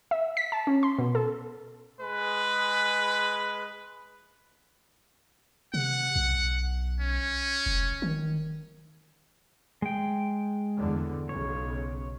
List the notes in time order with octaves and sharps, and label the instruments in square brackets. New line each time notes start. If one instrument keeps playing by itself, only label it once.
[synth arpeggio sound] E5
B6
A5
C#4
C6
B2
A4
[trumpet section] G#3 G#4 B4
[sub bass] C3 [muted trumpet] F#5
[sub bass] B1
[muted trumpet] C#4
[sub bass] F1
D#3
[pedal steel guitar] G#3 G5
[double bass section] E2 D3
[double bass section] B1 C#3 [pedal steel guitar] C#5